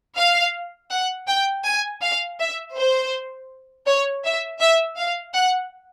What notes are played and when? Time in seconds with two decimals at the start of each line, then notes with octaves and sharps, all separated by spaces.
0.17 F5
0.91 F#5
1.28 G5
1.65 G#5
2.02 F5
2.40 E5
2.76 C5
3.87 C#5
4.24 E5
4.60 E5
4.97 F5
5.34 F#5